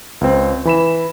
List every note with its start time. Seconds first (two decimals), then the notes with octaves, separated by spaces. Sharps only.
0.21 C#2 C4
0.65 E3 B5 E7